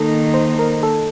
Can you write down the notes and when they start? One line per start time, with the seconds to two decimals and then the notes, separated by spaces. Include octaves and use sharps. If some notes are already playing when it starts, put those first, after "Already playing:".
Already playing: D#3 A#3 D#4 A4
0.34 C5
0.59 A#4
0.83 A4